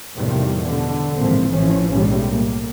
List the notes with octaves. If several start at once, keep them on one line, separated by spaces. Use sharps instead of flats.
E2 A2 C3 D#3 F3 G3
B2 D3
G#1 A#2 E3 F3 C4
A1 A2 E3 F3 C#4
B1 A2 G3 G#3
A2 A#3